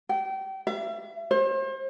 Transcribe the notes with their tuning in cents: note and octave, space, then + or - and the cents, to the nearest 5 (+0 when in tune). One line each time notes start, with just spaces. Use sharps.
G5 -30
E5 +40
C5 +40